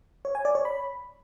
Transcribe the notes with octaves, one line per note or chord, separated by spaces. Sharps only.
C#5
G#5
D5
C#5
B5